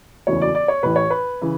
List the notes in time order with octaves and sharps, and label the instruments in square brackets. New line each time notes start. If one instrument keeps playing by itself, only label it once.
[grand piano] E1 D2 C#3 E3 C#5
D5
D5
C#5
A1 A2 E3 B4
C#5
B4
C#3 E3